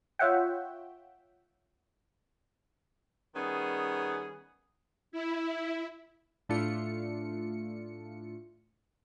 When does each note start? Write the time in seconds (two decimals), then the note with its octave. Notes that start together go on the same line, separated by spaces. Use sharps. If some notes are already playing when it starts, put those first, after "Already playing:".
0.19 F4 C#5 E5 F#5 G5
3.34 D#3 G3 B3 C#4 G#4
5.12 E4
6.49 A2 A3 D4 F4 C#7